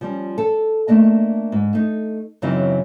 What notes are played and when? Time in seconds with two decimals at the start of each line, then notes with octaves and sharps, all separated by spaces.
0.01 F3 G3 C#4
0.38 A4
0.88 A3 A#3 D4 D#5
1.52 G#2
1.73 A3 D#4
2.42 F#2 C#3 E3 F#3 C4 D#4